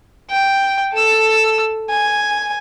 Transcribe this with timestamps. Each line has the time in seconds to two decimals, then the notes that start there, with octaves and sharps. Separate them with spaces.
0.31 G5
0.93 A4 E6
1.90 G#5